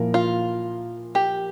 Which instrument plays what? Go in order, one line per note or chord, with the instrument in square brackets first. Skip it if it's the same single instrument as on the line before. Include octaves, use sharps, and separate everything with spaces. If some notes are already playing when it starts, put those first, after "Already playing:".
Already playing: [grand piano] A#2 F3 A#3 E4 A#4
[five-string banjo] F4
G4